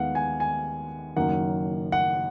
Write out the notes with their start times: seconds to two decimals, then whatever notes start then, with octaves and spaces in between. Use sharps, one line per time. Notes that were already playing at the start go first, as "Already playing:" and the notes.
Already playing: D#2 D#3 G#3 B3 F5 F#5
0.15 G#5
0.40 G#5
1.16 F#1 F#2 D#3 F#3 A#3 F#5
1.92 F#5